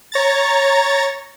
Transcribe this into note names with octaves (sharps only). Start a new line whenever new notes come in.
C#5 A#5 A6